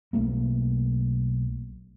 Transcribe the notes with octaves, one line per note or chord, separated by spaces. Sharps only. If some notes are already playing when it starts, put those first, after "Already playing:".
B1 A3 A#3